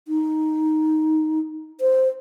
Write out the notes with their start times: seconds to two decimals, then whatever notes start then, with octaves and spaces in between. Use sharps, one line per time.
0.08 D#4
1.81 C5